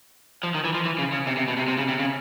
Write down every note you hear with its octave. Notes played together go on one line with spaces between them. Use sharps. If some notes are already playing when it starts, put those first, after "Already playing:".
F3
D#3
E3
F3
E3
C#3
C#3
C3
C3
B2
C3
C3
C#3
C3
C#3